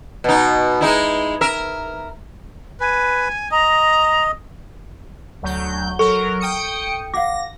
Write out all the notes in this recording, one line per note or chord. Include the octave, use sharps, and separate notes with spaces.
B2 D#4
G#3 D#4 E4
A#4 E5
B4 G#5
D#5 A#5
D2 F#3 G6
F#3 A4 A#4 C#6
G5 D#6 C#7
F5 F#5 D6 A#6